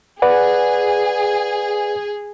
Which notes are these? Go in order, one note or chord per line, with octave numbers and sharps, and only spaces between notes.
G#4 B4 D5 F#5